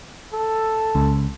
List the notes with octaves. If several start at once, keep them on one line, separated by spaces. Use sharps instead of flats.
A4
C#2